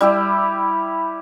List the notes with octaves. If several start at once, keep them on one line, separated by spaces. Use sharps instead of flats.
G3 E4 G4